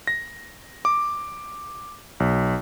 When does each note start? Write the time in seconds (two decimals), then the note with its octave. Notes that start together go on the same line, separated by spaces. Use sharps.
0.07 A#6
0.85 D6
2.20 B1